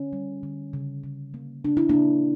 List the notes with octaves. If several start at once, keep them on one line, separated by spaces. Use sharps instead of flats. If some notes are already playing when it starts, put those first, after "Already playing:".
Already playing: D3 C#4
G3
D3
C#3
C#3
A#3
C#3 D4
E4
C#3 A#3 D4